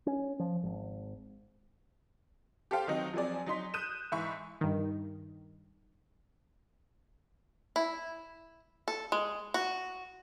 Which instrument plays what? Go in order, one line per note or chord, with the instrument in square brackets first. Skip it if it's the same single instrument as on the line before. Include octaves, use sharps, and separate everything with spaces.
[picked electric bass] C#4
F3
G#1
[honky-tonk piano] G4 A4 C5 F5 G5
D#3 F#3 C4 D#4
F3 F#3 C4 G#4 D5
F#3 D#4 C6 B6
D#6 F#6 G6 D#7 E7
G#2 E3 E5 B5 C#6
[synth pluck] G2 D#3
[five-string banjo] E4
A4
G#3
F#4